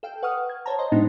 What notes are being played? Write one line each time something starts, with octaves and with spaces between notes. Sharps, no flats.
A4 F5 G5
B4 F#5 C#6 D#6 F6
G#6
C5 C#5 A5 A#5
C5 D#5 C6
A2 G#3 B3 D4 D#4